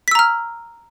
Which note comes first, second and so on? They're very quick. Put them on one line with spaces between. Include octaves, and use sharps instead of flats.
B6 E6 A#5 F6